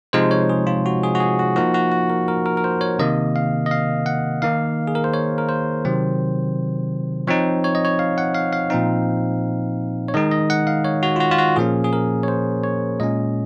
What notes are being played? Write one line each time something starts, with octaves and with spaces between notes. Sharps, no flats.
C3 F3 G#3 D#4 C5
C#5
G#4
F4
F#4
G#4
F#4
G#4
F#4
F3 A#3 D#4 F#4
F#4
F#4
A#4
A#4
A#4
A#4
C5
C#5
C3 D#3 A#3 D#5
F5
D#5
F5
F#5
D#3 A#3 D#4 F5
G#4
A#4
C5
C#5
A#4
C5
C3 D#3 F#3 C4
F3 C4 D#4 C#5
C#5
D#5
C#5
F5
F#5
F5
F5
A#2 F3 C4 D#4 F5
C#5
D#3 G#3 D#4 D#5
D#5
F#5
F5
C#5
F#4
F4
F#4
F4
F#4
A#2 F3 A#3 C#4 G#4
G#4
A#4
C#5
C5
C#5
A#2 G#3 C#4 D#5